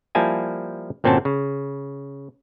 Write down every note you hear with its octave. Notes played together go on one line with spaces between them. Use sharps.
F3 G3 A#3 E4 G#5 A5
G1 A#2 C4 C#4 F#4 A5
C#3